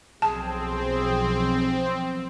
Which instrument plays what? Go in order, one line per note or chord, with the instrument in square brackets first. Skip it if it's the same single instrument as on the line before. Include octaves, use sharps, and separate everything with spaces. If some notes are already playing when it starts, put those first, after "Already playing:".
[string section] B1 F3 [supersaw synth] C4 [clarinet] G#4 [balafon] A5